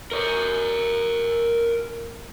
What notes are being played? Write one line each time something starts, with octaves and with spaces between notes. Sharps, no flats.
A#4 C#5